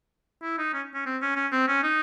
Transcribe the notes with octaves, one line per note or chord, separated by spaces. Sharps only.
E4
D#4
C#4
C#4
C4
C#4
C#4
C4
C#4
D#4